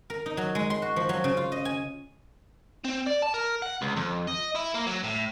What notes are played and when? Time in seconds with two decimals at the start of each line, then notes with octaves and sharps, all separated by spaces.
0.10 A#4
0.26 D#4
0.37 F#3
0.55 G#3
0.70 C6
0.82 F#4
0.96 F3
1.09 F#3
1.24 C#3
1.37 F4
1.52 D#5
1.65 G#5
2.84 C4
3.06 D5
3.22 A5
3.34 A#4
3.62 F#5
3.82 C#2
3.97 F2
4.27 D#5
4.55 E4
4.75 A#3
4.87 F#3
5.04 A2